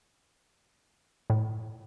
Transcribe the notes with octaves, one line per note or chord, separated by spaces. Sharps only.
A2